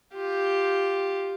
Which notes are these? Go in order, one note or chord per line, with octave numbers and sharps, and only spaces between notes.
F4 G4